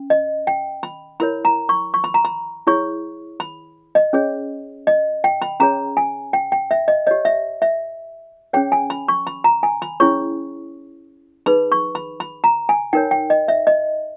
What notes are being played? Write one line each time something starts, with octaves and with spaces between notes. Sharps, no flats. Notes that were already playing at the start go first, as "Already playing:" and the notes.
Already playing: C#4
D#5
G5
B5
E4 A#4 C#5 B5
A#5
C#6
C#6
B5
A#5
B5
E4 G#4 C#5 C#6
B5
D#5
C#4 G#4 C#5
D#5
G5
B5
C#4 G#4 C#5 A#5
G#5
G5
G5
E5
D#5
G4 C#5 D#5
E5
E5
C#4 G#4 C#5 G5
G#5
B5
C#6
B5
A#5
G#5
B5
C#4 E4 G#4 C#5 C#6
D#4 G#4 B4 B5
C#6
B5
B5
A#5
G#5
D#4 A#4 C#5 G5
G5
D#5
E5
D#5